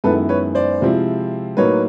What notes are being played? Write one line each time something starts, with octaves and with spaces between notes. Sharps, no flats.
F#2 D#3 G#3 B3 E4 A4 B4
B4 C#5
C5 D5
C3 F3 G#3 C4 E4
A2 F#3 A#3 D#4 B4 C#5